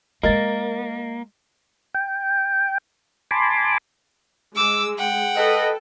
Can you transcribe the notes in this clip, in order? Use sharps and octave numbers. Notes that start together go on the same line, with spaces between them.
G#3 A#3 F4 A#4 D#5 A6
G5
G#5 A5 B5 C6 D6
G#3 D6 E6
F#5 G5
A4 B4 D#5